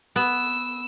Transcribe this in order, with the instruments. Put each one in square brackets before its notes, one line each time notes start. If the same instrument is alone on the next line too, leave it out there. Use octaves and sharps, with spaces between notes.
[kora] B3 [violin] E6